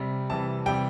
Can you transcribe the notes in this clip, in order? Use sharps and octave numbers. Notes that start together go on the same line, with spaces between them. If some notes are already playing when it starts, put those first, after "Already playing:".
Already playing: C3 G3
C3 E3 G3 A5
C3 E3 G3 G5